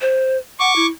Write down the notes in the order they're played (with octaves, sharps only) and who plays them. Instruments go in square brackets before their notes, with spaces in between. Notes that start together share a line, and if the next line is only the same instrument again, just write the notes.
[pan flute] C5
[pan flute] F#5 [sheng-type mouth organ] C#6 D6
[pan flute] E4